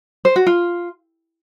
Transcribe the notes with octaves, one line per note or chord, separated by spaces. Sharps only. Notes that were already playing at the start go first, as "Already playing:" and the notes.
C5
F#4
F4